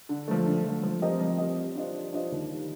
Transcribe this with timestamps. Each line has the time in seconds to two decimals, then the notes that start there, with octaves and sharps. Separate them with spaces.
0.09 D3
0.28 F3 A3
0.47 D3
0.65 F3 A3
0.83 F3
1.02 C4 G4 A#4 D#5
1.21 F3
1.38 C4 G4 A#4 D#5
1.57 G3
1.75 D4 F4 C5 D#5
1.94 G3
2.13 D4 F4 C5 D#5
2.32 D#2
2.50 D#3 G3